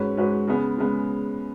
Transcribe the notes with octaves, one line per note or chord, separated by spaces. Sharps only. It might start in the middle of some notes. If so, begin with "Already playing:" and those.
Already playing: G#2 G#3 C#4 F#4 B4
G#2 G#3 C#4 F#4 B4
C#3 G#3 B3
C#3 G#3 B3